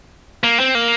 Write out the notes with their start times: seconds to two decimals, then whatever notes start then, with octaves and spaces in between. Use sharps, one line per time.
0.44 A#3
0.60 C4
0.75 A#3